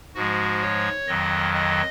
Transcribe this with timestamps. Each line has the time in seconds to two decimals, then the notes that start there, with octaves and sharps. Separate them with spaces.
0.15 G#2 F3 G#3 F#4
0.62 C#5
1.08 F2 D#3 F#3 D#5
1.54 D#5